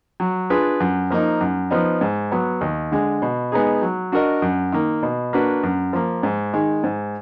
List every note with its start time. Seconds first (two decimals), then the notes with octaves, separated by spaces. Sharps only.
0.20 F#3
0.50 D4 F4 G#4 B4
0.80 F#2
1.11 F3 A#3 D#4
1.41 F#2
1.70 F3 B3 D#4
2.01 G#2
2.31 F#3 B3
2.61 D#2
2.92 D3 G#3
3.22 B2
3.52 G#3 B3 D#4 G#4
3.82 F#3
4.12 D4 F#4 A#4 D#5
4.42 F#2
4.72 D#3 A#3
5.03 B2
5.33 A#3 D4 F#4 B4
5.63 F#2
5.93 F3 A#3
6.23 G#2
6.54 D#3 G#3
6.84 G#2